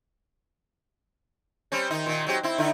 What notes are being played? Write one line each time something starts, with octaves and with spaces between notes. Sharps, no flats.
G3 C4 C#4
D#3 D#4
A#2 D#3
F#3 C4 G4
C4 E4
D3 D#4 E4